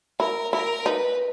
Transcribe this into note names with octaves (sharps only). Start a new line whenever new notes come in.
E4 A#4
E4 A#4
D#4 B4